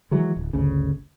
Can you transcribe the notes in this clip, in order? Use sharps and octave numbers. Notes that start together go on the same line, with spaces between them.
D#3 E3 F#3 G#3
D1
G1 D2 C#3